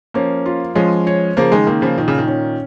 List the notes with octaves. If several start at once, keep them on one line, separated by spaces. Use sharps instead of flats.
F3 A#3 C#4
F4
F3 G#3 C#4
C#5
C#3 F3 A#3
D#3 G#3
D#3 A#3
C#3 F3
A#2 D#3
C#3
D#3
C#4